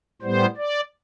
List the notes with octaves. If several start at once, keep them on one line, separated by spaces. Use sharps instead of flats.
A2 G3 B3 C5
D5